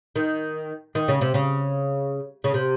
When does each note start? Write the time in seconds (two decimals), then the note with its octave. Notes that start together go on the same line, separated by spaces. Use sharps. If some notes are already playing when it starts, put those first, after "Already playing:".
0.16 D#3
0.95 D#3
1.08 C#3
1.21 C3
1.34 C#3
2.44 C#3
2.54 C3